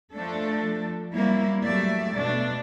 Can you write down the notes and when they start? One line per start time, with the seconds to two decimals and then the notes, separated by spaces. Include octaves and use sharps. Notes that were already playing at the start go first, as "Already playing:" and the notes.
0.13 F3 A3 D4 A4
1.14 F#3 G3 A#3 C4 E4
1.63 F#3 G3 A3 D5 E5
2.16 B2 A3 D4